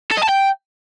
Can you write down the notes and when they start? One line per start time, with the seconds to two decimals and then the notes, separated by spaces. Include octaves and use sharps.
0.11 A4
0.17 D#5
0.23 A5
0.29 G5